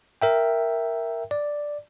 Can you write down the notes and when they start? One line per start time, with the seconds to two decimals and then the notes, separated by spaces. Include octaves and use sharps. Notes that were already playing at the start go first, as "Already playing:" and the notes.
0.22 A#4 E5 G5
1.31 D5